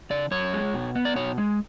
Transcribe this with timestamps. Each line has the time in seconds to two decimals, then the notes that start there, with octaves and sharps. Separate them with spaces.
0.10 C#3 D5
0.31 F#2 C#5
0.53 G#3
0.74 B2
0.95 B3
1.05 D5
1.16 B2 C#5
1.38 G#3